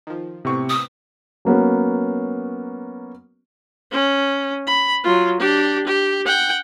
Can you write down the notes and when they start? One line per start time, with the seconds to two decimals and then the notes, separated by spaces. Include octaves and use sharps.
0.07 D#3 F3
0.45 A2 C3 B3 C4 C#6
0.69 D#6
1.45 F#3 A#3 B3 C#4
3.92 C#4
4.67 B5
5.04 F#3 F4
5.40 D4 G4
5.87 G4
6.26 F#5 G5